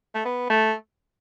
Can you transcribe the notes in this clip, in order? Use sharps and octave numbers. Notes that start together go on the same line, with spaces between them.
A3
B3
A3